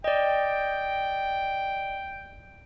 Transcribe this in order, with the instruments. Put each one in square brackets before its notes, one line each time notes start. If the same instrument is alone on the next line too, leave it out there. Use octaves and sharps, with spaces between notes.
[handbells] D5 D#5 [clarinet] G5